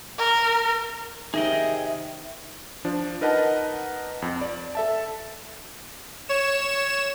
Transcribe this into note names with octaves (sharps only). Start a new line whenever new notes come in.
A#4
C3 D#3 D#4 G#4 D#5 E5 G5
F3 D4
D#4 A#4 B4 D#5 F#5 A5
F2
D5
A4 E5 A5
C#5 E7